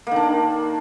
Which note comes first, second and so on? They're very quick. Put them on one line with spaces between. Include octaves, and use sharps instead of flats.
A#3 D#3 D4